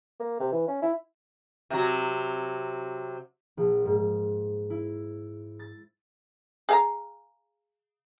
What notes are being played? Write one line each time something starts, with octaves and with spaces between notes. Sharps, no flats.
A#3
C3
E3
C#4
E4
C3 F#3
A#1
G#2
E4
A6
G#4 F5 A#5